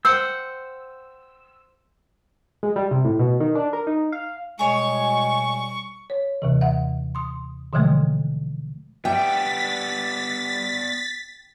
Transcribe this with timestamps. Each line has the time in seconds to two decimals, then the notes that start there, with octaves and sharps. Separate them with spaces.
0.05 C5 F#5 G5 E6
2.63 G#3
2.76 G3
2.91 C3
3.05 A2
3.19 B2
3.40 D#3
3.55 D4
3.73 A#4
3.87 D#4
4.12 F5
4.59 B2 G3 G#3 G#4 C#5 C#6
6.10 C#5
6.42 D#2 C3 E3
6.61 E5 F#5
7.15 C6 D#6
7.73 B2 D3 E3 F3 G#3 A3
9.05 G3 B3 D4 G4 E5 G5 A6 B6